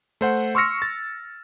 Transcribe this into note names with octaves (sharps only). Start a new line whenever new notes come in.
A3 C5 F#5
C6 C#6 E6 F6 A#6 C#7
A6